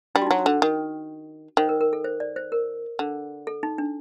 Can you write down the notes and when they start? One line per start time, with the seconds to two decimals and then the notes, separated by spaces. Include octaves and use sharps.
0.15 G3 D4
0.22 F#4
0.27 F#3 D#4
0.39 F#4
0.46 D3
0.62 D#3
1.57 D#3 C5
1.69 A#4
1.81 A#4
1.93 A4
2.04 C5
2.20 D5
2.36 C5
2.52 A#4
2.99 D3
3.47 A4
3.63 D#4
3.78 D4